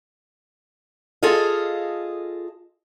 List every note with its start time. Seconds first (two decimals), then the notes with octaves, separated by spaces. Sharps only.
1.23 F4 G#4 A4 D#5 F5